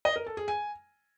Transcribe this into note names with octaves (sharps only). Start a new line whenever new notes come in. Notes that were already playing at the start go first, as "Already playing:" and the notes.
D#5
A#4
A4
G#4
G#5